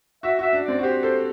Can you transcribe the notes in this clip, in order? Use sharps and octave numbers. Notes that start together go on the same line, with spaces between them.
F#4 E5
F#4 E5
D4
C4 D5
F#4
G4 C5
A4 C5